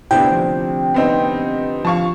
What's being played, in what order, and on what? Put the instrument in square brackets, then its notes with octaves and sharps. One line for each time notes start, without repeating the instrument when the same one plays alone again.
[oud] D2 C3 [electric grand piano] B3 D4 E4 [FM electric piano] G5
[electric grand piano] F3
[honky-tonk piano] B3 C4 D#4
[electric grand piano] F3 F5 [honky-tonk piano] A5 C#6